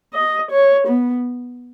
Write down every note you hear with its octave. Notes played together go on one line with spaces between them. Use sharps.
D#5
C#5
B3